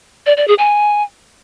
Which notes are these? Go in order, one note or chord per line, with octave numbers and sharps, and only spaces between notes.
D5
D5
G#4
G#5